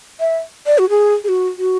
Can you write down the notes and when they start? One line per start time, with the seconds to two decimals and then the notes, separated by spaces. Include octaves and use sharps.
0.20 E5
0.66 D5
0.78 F#4
0.89 G#4
1.24 G#4
1.28 F#4
1.58 F#4